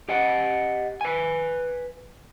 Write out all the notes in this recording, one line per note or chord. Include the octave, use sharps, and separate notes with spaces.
G4 D#5 F#5
B4 G#5